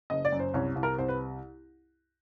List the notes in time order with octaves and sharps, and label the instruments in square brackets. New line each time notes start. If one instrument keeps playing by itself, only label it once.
[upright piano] F#1 D#5
D5
F#2
C5
C2 C#5
C2
A#4
C2 C5
B4